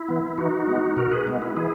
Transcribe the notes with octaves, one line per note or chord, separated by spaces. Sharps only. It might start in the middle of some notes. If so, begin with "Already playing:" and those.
Already playing: E4
E3 B3
E3 D#4 F#4
G#3 B3
B2 F#4 A#4
G#4 B4
G#3 B3
E4
E3 E4 G#4